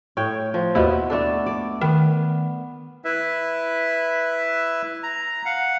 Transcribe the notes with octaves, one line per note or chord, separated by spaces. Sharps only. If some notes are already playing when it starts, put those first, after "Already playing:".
A2 C#5 G5
F3
D#2 B2 B3 E4
A3 D4 A4
D5
D#3 B3
E4 B4 E5
A#5
F5 F#5